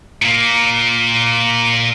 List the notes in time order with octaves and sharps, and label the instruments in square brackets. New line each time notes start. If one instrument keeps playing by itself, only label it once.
[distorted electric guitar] A#2 A#3